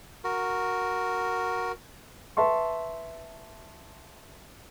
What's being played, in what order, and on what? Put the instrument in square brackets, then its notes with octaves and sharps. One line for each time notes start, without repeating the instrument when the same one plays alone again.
[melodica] F#4 A#4
[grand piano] B4 E5 A5 C6 C#6